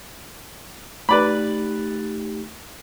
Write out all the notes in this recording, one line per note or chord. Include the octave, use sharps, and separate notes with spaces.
A3 D#4 G4 B4 D5 B5